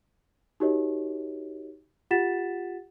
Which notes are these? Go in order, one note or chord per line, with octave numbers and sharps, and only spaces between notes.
D#4 F#4 G4 A#4 C#5 D#5
F4 G4 F#5 A6 B6 E7